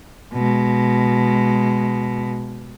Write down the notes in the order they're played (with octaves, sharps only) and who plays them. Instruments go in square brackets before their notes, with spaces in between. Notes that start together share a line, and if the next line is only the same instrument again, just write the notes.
[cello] B2 G#3